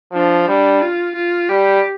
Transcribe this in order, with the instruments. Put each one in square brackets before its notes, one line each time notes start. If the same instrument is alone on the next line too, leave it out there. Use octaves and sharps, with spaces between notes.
[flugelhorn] F3 [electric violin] D4
[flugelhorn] G3 [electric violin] D4
[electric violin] F4
F4
[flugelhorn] G3 [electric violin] G4